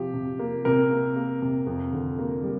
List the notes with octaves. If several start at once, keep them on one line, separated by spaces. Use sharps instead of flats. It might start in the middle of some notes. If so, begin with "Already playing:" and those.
Already playing: C3 F3 G4
C3
A#3
C3 A#4
A#3
A#3
C3
F2
D3
A#3
G3